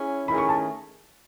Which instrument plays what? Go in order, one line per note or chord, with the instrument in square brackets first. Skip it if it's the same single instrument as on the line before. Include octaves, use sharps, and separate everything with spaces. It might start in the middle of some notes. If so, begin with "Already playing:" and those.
Already playing: [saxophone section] C#4 E4 G#4
[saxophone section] D#3 A3 C#4 E4 G#4 [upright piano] B5
[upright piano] C#6
A5